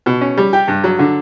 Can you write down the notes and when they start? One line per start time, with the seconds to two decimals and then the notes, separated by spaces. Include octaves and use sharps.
0.06 B2
0.21 C#4
0.37 G3
0.53 G4
0.68 G2
0.84 F#3
0.99 D3